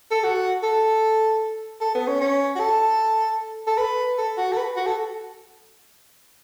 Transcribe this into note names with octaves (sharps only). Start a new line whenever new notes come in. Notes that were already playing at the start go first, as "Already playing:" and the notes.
A4
F#4
A4
A4
B3
C#4
C#4
F#4
A4
A4
B4
A4
F#4
A4
B4
F#4
A4